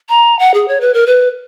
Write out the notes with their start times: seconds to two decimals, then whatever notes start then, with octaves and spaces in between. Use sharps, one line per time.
0.09 A#5
0.39 F#5
0.54 G#4
0.68 C#5
0.81 B4
0.94 A#4
1.07 B4